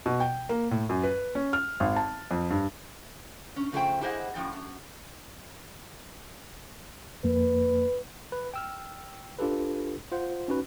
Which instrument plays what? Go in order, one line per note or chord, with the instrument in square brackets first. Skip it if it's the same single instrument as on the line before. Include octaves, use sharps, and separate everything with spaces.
[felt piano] B2
G5
A#3
A2
F#2
B4
C#4
F6
G#1
A5
F2
G2
[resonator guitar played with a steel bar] C#4
C#3 F3 A3 G#4 C5 G5
E4 G4 G#4 C5 D#5 F#5
F#2 A2 F3 G5
F#2
[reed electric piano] F2 A#3 [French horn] B4
[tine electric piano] B4
G5 E6 F6
D4 F4 G4 A4 B4
F4 C5 F#5
C#4 D#4 F#4 B4